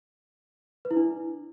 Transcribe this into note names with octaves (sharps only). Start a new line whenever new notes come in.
B4
E4
D4